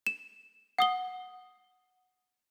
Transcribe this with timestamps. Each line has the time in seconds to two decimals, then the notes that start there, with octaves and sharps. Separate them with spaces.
0.07 E7
0.79 F#5 D#6 G7